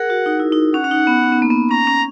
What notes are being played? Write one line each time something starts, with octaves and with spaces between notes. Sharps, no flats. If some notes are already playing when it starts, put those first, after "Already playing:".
Already playing: G#4 A#4 F#5
F#4
D#4
E4
D#4
C#4 F#5
C#4
D#4
B3
C#4
B3
A#3
B3
C#4 A#5
C#4